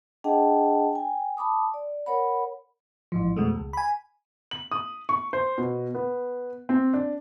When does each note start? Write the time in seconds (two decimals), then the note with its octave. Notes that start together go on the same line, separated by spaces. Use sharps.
0.24 D4 G#4 D#5 F#5 G5 A5
0.93 G5 G#5
1.37 A5 B5 D6 D#6
1.74 D5
2.06 A#4 C#5 F#5 B5
3.12 A1 G#2 F3
3.36 F2 B2 G#3 A3
3.56 C#2
3.73 G#5 B5
4.51 F#7
4.71 D#6
5.09 C#6
5.33 C5
5.58 B2
5.95 B3
6.69 C4
6.93 D4